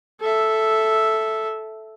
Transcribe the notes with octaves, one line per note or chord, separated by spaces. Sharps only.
A4 E5